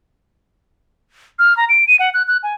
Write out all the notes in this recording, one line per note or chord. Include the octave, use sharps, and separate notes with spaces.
F6
A#5
D7
D#7
F#5
F#6
F#6
G#5